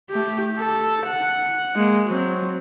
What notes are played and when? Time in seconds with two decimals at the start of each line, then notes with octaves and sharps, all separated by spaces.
0.10 A3 G4
0.58 A4
1.07 F#5
1.75 G#3 A#3
2.07 F#3 C4